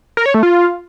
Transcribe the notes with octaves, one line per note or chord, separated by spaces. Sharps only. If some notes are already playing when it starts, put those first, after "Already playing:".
A#4
C#5
A3
F4